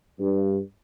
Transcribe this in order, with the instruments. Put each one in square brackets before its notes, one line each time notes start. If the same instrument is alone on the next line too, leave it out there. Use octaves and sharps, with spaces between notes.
[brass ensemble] G2